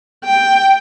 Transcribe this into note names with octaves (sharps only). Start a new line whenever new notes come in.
G5